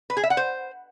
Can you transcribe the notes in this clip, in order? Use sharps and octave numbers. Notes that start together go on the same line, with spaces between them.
B4
G#4
E5
F#5
C5